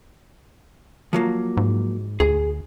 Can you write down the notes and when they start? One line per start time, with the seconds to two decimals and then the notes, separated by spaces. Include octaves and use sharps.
1.13 F3 F#3 A#3
1.57 G#2
2.20 D2 G#4